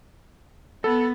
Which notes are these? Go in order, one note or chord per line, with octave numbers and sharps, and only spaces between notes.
B3 A4